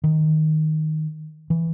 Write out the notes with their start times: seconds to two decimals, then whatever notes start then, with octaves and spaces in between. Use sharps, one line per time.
0.04 D#3
1.50 E3